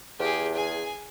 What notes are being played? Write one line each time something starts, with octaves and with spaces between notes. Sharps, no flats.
E2 G4 G#4
G#4 G#5